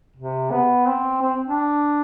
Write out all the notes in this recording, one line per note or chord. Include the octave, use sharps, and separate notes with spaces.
C3
B3
C4
C4
D4